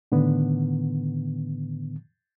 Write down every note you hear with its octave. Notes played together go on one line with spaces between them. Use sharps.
A2 D3 D#3 B3